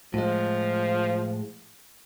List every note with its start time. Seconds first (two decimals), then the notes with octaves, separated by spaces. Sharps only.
0.14 A2 F3 G#3